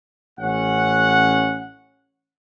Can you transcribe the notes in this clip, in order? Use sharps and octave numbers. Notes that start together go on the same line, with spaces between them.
A1 C#4 F#5